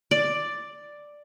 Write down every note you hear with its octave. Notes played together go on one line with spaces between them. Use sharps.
D5